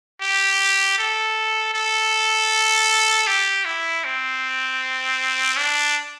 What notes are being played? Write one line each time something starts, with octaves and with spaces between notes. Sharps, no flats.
G4
A4
A4
G4
E4
C4
D4